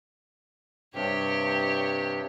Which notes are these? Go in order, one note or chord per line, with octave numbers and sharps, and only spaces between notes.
G2 C3 G4 C#5